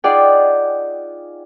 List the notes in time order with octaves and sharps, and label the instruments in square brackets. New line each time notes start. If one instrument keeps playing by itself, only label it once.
[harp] D#4 F4 G#4 D5 F#5 G5